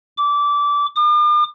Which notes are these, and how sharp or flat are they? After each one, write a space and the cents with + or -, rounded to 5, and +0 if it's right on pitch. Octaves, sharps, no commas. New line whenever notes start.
D6 -20
D6 +45